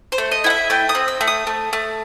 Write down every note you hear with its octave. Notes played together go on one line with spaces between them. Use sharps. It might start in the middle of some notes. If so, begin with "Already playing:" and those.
C5
A3
D#5
E4 F#5
E5
A3 G5
D#6
C4
E6
A3
D#6
A3
A3